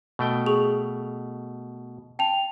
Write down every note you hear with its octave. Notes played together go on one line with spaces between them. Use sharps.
B2 A3 G5
G#4 C#6 F7
G5 A5 F7